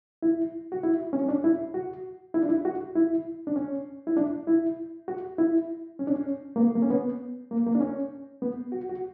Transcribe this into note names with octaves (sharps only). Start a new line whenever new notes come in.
E4
F#4
E4
C#4
C#4
D4
E4
F#4
E4
D4
E4
F#4
E4
D4
C#4
E4
D4
E4
F#4
E4
C#4
D4
C#4
A#3
B3
A#3
C#4
B3
A#3
A#3
D4
C#4
B3
F#4
F#4